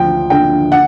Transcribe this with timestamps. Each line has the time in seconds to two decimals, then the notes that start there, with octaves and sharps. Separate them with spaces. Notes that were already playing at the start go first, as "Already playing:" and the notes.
Already playing: D2 F3 G5
0.30 D3 G5
0.72 F#5